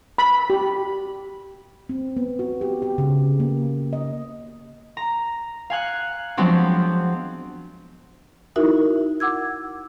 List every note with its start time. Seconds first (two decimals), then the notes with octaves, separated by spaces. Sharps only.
0.18 B5
0.50 G4
1.89 C4
2.17 B3
2.39 F#4
2.61 G4
2.82 G4
2.98 C#3
3.40 A#3
3.93 D#5
4.97 A#5
5.70 F5 G#5 F#6 C#7
6.37 F3 F#3 G#3 B3 C4 D4
8.56 D#4 E4 F#4 A#4 E5
9.20 F#5 D6 E6 G#6